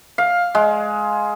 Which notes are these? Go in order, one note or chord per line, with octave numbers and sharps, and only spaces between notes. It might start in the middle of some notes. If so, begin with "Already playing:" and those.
F5
G#3